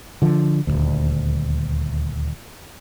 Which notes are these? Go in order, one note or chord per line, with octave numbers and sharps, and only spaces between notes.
D3 F3
D#1 G#1 D2